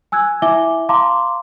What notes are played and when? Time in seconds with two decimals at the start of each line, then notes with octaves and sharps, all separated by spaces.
0.12 G#5 E6 F#6 G#6
0.42 E4 E5 G#5 D6 G7
0.89 F5 A5 A#5 C6 D6